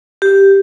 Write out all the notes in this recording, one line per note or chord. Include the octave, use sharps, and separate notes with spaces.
G4